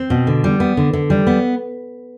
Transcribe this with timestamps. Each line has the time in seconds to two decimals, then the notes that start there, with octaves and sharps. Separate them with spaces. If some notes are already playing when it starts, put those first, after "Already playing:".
Already playing: C4
0.10 B2
0.27 D3
0.44 G3
0.60 B3
0.77 D3
0.93 D3
1.10 G3
1.27 B3